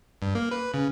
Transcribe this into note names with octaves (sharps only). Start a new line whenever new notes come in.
G2
A#3
B4
C#3